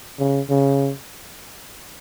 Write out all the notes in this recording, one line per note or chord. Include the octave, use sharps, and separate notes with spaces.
C#3
C#3